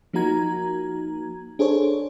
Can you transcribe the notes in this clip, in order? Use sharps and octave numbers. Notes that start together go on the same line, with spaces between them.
F3 A#3 D#4 F#4 A#5 G#6
D4 G#4 A4 C5 C#5